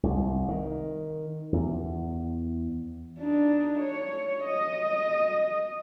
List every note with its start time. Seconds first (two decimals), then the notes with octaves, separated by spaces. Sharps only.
0.03 C2
0.48 D#3
1.53 E2
3.19 D4 D#4
3.80 C#5
4.45 D#5